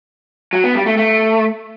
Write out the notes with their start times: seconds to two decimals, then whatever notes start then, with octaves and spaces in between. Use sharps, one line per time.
0.53 F#3
0.64 B3
0.75 G3
0.86 A3
0.97 A3